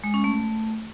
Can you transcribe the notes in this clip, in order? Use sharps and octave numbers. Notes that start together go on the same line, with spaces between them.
G#3
C#4
A3